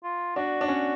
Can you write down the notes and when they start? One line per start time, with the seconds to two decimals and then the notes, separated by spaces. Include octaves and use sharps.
0.04 F4
0.36 D4 F#4
0.61 D4
0.68 C#4